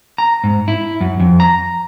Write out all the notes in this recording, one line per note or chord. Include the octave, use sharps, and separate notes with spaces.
A#5
G#2
E4
F#2
F2
A#5